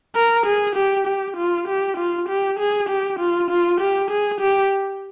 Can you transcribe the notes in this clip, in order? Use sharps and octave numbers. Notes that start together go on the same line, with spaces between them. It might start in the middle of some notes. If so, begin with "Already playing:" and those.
A#4
G#4
G4
G4
F4
G4
F4
G4
G#4
G4
F4
F4
G4
G#4
G4